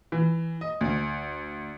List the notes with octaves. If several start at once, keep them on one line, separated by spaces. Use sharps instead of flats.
E3
D#5
D2